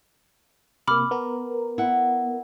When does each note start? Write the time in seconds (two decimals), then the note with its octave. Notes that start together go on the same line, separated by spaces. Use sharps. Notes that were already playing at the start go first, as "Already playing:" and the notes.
0.88 C3 A#3 B5 D6 F6
1.11 B3 A#4
1.78 E4 F#5